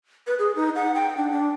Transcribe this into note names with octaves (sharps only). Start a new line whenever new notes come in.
B4
G#4
D#4
F#5
G5
D4
D4